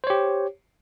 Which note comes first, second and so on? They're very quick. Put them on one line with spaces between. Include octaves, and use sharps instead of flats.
C5 C#5 G4